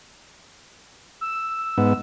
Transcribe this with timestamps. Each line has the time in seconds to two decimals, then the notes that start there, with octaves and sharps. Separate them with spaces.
1.21 E6
1.78 G#2 B3